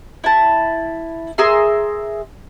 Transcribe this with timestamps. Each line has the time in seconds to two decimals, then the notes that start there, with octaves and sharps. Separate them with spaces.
0.24 E4 A5
1.38 G#4 A#4 E5 C6